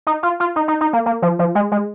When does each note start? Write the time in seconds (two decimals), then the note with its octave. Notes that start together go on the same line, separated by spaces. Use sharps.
0.07 D#4
0.23 F4
0.40 F4
0.56 D#4
0.68 D#4
0.81 D#4
0.93 A#3
1.06 A#3
1.22 F3
1.39 F3
1.55 G#3
1.72 G#3